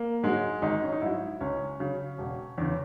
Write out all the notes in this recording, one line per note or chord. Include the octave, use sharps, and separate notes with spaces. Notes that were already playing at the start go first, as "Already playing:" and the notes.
Already playing: A#3
G#2 F#3 G#3
G#1 D#4
C#4
D#4
G#2 F#3 E4
C#2 C#4
C#3 F#3
E1
E2 C#3